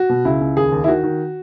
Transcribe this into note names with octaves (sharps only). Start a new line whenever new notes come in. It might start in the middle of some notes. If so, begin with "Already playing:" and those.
Already playing: F#4
B2
C#2 E4
C#2
D#2 G#4
D#2
E4
D#3 F#4
D#3